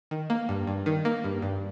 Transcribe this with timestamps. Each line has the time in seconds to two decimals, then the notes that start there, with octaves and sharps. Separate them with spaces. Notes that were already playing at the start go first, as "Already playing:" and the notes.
0.11 D#3
0.30 A#3
0.49 G2
0.67 G2
0.86 D#3
1.05 A#3
1.24 G2
1.42 G2